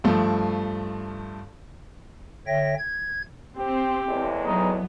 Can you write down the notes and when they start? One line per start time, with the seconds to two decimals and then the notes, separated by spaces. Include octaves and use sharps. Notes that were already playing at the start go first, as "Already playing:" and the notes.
0.04 G2 F3 A3
2.47 D3 C#5 E5 G5 A#6
2.78 G#6
3.57 C4 G4
4.09 E2 A2 G#3
4.45 F#3 B3 D#4